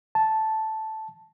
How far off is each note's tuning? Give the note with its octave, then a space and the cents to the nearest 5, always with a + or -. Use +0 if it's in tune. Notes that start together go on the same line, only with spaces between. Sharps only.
A5 -5